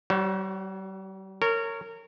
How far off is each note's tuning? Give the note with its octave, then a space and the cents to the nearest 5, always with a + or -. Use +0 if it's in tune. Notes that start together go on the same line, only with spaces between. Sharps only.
G3 -40 F#4 +20 C#5 -45
A#4 -25 C#5 +0